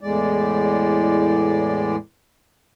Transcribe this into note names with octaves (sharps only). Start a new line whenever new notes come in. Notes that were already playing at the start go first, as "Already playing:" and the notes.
E2 A2 G#3 D5